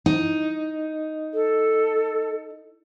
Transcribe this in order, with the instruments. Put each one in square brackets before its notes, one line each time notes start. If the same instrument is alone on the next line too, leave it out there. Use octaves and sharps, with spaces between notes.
[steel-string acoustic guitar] D#4
[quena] A4